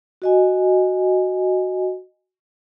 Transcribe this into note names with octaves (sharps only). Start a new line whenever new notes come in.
F#4 D#5 G#5